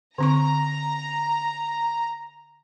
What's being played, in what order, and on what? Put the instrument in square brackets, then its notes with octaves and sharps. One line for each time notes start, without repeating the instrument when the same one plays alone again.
[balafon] D3 C4 C#6 [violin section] A#5